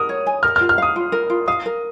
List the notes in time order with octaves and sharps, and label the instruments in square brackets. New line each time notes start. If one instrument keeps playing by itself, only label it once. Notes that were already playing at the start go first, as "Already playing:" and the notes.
Already playing: [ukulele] A#4 [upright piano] D#6
[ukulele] C#5
G#5
[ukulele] A#4 [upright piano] F6
[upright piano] F6
[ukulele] F4
[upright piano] F6
[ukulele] F5 [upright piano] D#6
[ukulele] F4
A#4
F4
[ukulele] F5 [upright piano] D#6
[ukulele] A#4